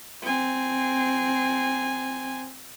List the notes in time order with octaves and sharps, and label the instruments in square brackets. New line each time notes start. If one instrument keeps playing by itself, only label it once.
[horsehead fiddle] C4 G#5